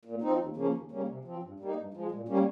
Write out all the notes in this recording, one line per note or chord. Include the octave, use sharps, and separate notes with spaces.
A#2
F3 C4 D#4
D#2
C#3 F3 A#3 C#4
D#2
C#3 G3 A#3 C#4
C3
F3 C4
G2
G3 A#3 D#4
G2
F3 G#3
A#2
G3 A#3 C#4